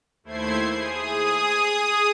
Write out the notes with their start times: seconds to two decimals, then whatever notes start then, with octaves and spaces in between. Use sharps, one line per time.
0.24 D#2 A3 E4 C5 G#6 C7
0.74 G#4 D#6